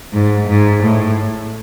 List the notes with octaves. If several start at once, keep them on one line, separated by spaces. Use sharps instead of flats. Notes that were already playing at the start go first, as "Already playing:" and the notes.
G#2
G#2
A2